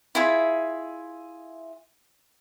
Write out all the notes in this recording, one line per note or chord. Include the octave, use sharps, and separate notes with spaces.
E4 F4 G#4 E5